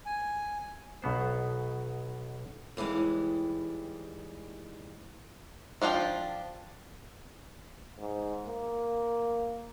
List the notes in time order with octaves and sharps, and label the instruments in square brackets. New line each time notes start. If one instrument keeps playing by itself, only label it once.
[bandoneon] G#5
[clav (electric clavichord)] B1 B2 B3 C5
[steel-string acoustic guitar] D#2 E3 G3 G#3
[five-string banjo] F3 D4 F4 G5
[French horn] G#2
A#3